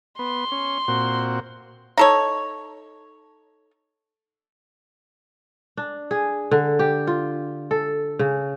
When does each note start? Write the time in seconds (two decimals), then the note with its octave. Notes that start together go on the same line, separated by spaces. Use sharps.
0.19 B3 C6
0.52 C#4
0.88 A#2 C4 F#4
1.97 D#4 A4 C#5
5.77 D4
6.11 G#4
6.51 D3
6.79 G4
7.07 F4
7.71 A4
8.19 C#3